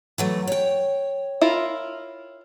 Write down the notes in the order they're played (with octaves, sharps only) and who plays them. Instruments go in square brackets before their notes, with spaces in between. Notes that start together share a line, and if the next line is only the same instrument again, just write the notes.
[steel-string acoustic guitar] E3 F#3 A3
C#5 G5
[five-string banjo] E4 F4 A#4